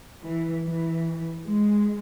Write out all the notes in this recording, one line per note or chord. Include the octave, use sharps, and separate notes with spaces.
E3
E3
G#3